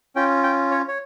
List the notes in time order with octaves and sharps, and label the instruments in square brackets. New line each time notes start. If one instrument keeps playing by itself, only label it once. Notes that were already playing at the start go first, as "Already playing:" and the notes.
[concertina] C#4 F4 G5
G5
C#5
C#5